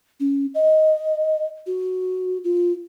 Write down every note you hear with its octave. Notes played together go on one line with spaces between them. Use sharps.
C#4
D#5
F#4
F4